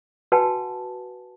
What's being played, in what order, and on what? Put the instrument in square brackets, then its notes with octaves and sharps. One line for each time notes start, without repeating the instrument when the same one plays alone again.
[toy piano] F#4 B4 F#5 G#5 A5